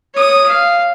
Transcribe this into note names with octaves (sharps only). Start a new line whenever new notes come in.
C#5 D#6
F5